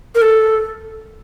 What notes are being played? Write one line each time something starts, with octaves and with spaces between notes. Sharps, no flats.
A#4
A4